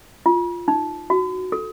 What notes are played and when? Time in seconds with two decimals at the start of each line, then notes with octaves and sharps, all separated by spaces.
0.26 F4
0.68 D#4
1.10 F#4
1.52 A4